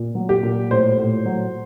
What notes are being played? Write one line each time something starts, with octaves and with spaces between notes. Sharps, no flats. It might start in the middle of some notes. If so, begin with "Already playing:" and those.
Already playing: A#2
F#3
G4
A#2
A2 C5
A2
F#3